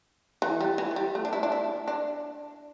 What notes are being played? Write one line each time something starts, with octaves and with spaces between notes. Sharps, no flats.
E3
G3
E3
E3
G3
A3
D4
E4
D4
E4
D4